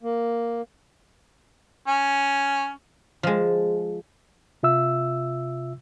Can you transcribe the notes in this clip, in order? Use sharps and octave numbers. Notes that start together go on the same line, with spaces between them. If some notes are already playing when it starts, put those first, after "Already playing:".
A#3
C#4
F3 G#3
C3 F4 E5 E6